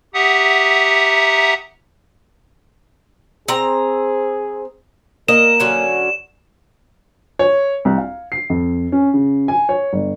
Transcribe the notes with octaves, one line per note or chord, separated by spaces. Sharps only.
G4 E5 F#5 A#5 D#6
C4 G#4 A#5
A#3 A#4 D#5 E7
D3 F#3 C#4
C#5
C2
F5
C7
F2
C#4
C#3
G#5
C#5
G1